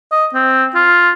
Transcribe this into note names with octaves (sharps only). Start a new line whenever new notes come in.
D#5
C4
F4